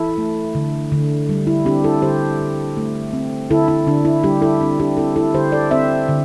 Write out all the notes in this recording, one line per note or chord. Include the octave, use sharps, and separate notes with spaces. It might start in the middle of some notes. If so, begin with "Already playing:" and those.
Already playing: E3 E4 A4
A3
D3
D3
G3
E4
C4 D4 G4
E4 A4
D3 G4 C5
D3
A3
C4
D3 E4 A4
E4
D3 D4
E4
G3 D4 G4
E4 A4
C4 D4
D4 G4
C4 E4 A4
E4 A4
D3 G4 C5
A4 D5
C4 C5 E5
D3